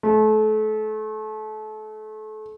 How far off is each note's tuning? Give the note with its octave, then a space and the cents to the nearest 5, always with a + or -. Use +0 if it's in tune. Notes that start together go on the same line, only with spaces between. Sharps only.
A3 -30